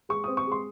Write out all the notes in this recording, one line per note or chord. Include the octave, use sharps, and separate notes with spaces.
G#3 C#6
C4 D#6
C#6
G#3 C6